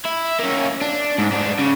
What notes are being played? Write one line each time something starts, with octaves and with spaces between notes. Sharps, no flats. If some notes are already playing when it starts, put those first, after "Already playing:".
E4
A#3 C#4
D4
G#2
G#2 D4
C#3